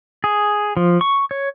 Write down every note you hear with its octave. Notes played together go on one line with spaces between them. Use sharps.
G#4
F3
C#6
C#5